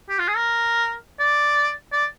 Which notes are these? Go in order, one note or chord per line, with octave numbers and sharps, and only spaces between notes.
G4
F4
G#4
A#4
D5
D5